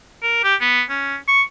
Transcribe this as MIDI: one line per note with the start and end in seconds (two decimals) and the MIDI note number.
0.23 0.40 70
0.44 0.55 67
0.61 0.83 59
0.90 1.16 61
1.28 1.42 85